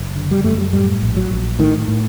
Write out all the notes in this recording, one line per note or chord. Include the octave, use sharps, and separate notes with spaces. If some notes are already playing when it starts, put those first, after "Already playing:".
Already playing: F#1
D3
G3
F#2 A3
G3
A2 G3
A#1
F#3
A#1
A2 D#3
A2